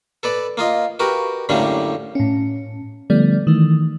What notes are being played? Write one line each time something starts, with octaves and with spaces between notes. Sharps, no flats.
A4 B4 D5
A#3 F4 D#5
F#4 G4 A#4 B4
F#2 A2 D3 G3 A#3 D4
A2 C#4
D3 F3 G3 A3 B3 D5
D#3 E3 A3